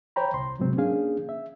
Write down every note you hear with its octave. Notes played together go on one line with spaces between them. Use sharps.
C5 C#5 G5 A#5 B5
C2 C6
G#2 C3 F#3 G#3 C4
A#3 C#4 D4 G#4 F5
E5